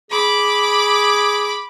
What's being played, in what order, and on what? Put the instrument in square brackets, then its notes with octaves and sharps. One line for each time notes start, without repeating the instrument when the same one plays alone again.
[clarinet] G#4 [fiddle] B5 D6